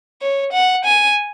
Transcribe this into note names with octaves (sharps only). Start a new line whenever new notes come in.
C#5
F#5
G#5